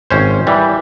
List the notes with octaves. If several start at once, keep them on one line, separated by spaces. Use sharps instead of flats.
G#1 C#4 C5
E3 G3